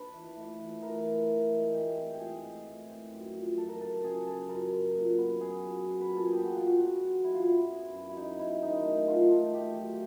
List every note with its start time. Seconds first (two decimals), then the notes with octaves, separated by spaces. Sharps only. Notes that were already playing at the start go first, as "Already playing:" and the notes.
Already playing: D4 B4
0.13 E3
0.36 A3
0.60 E3
0.82 A3 A#4
1.06 E3
1.28 E3
1.52 G#3
1.74 A2 G4
1.98 C4
2.14 G4
2.19 G#3 G#4
2.43 A2
2.66 A2
2.88 C4
3.12 F#2
3.35 F3
3.57 F#2 A4
3.69 A#4
3.80 C#3 A4
4.03 C#3 G#4
4.26 C#3 A4
4.49 F#2 A#4
4.73 F#2
4.95 A#2
5.18 B3
5.41 B3 G#4
5.64 F#3
5.87 D4
6.01 B4
6.09 A#2 A#4
6.17 A4
6.25 G#4
6.32 B3 G4
6.44 F#4
6.55 D4 F4
6.67 F#4
6.79 B3 F#4
7.02 F#3
7.24 F#3 E4
7.34 F4
7.44 F#2 E4
7.70 B3
7.93 F#2
8.09 E4
8.16 F#2 D#4
8.39 C#3 E4
8.62 D#3 D#4
8.84 A3
9.08 D#3 F4
9.30 A3
9.53 A3 G4
9.76 F#3